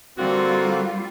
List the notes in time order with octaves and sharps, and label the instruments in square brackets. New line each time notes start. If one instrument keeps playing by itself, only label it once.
[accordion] D3 A#3 C4 [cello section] G3 F4 [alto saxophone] F#4